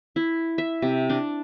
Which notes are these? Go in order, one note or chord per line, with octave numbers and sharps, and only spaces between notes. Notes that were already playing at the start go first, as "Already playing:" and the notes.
E4
E5
C3
D4